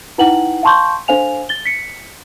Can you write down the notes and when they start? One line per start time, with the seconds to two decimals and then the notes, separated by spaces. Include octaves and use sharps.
0.18 D#4 E4 B4 F#5 G5 F#7
0.63 F5 G5 A5 C6 C#6 G6
1.08 D4 A4 C5 F5 G#5 F7
1.49 A6 G7
1.65 B6 C#7